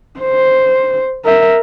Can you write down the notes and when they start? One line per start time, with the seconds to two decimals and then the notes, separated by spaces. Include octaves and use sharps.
0.20 C5
1.25 A#4 E5